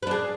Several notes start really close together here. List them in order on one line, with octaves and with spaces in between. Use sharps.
B4 D4 G#4